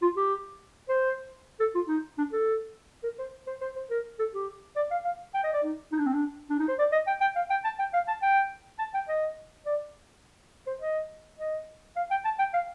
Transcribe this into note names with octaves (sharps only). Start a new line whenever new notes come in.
F4
G4
C5
A4
F4
D#4
D4
A4
A#4
C5
C5
C5
C5
A#4
A4
G4
D5
F5
F5
G5
D#5
D5
D#4
D#4
D4
C4
D4
D4
D#4
C5
D5
D#5
G5
G5
F5
G5
A5
G5
F5
A5
G5
A5
G5
D#5
D5
C5
D#5
D#5
F5
G5
A5
G5
F5